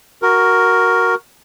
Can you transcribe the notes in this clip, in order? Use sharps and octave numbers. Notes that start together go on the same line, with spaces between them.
F#4 A#4